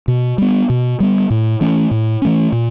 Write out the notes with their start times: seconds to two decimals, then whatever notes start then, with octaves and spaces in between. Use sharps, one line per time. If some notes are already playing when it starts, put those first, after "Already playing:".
0.08 B2
0.38 G3 B3
0.70 B2
1.00 G3 B3
1.30 A2
1.61 E3 A3 C#4
1.91 A2
2.22 E3 A3 C#4
2.52 A#2